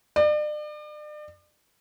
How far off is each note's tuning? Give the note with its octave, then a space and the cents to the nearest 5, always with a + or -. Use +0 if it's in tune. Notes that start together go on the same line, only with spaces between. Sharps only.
D5 +40